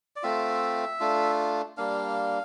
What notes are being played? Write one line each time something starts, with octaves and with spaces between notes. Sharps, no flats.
D5
A3 C4 F4 E5
A3 D4 F4
G3 A#3 D4 F5